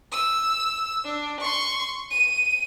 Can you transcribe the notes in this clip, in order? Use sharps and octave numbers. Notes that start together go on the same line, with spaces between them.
E6
D4
C6 C#6
D#7